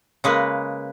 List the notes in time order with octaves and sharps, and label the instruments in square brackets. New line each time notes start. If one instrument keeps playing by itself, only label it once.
[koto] C#3 G#3 A#3 B4